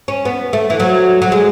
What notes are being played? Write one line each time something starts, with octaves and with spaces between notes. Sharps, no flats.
C#4
B3
A3
E3
F#3
F#3
G#3